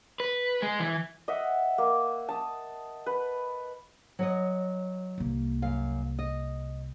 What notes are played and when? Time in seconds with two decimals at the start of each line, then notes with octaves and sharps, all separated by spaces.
0.20 B4
0.62 G#3
0.80 E3
1.28 D#5 E5 F#5
1.78 A#3
2.29 A5 D#6
3.06 B4
4.19 F#3 C#5 D#5
5.18 C2 A#3
5.62 F#2 F5
6.19 D#5